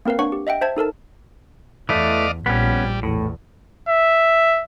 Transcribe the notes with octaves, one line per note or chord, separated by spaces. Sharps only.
A#3 C4 A#4 B4 F5
D4 C#5 F#5 C#6
G4
D#5 E5 F#5 G5
C5 E5 A5 G#6
D#4 A4 A#4 A5
E2 E3 A3 D5 D#5 F5
A#1 G3 B3 C#4
E2 A2
E5